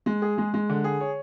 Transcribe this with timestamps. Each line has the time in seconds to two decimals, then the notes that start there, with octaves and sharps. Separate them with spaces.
0.06 G#3
0.22 G#4
0.38 G#3
0.54 G#3
0.69 D3
0.84 G#4
1.01 C#5